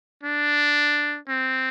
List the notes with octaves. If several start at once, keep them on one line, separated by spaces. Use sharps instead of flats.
D4
C4